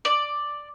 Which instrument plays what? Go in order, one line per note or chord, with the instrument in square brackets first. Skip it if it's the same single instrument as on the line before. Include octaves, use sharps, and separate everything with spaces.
[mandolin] D5